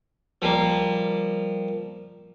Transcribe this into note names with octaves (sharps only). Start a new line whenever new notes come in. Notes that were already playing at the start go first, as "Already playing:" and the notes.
F3 G3 A#3